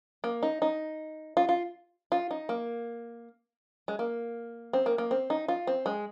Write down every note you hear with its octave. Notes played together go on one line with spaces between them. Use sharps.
A#3
D#4
D#4
F4
F4
F4
D#4
A#3
G#3
A#3
C4
A#3
A#3
C4
D#4
F4
C4
G#3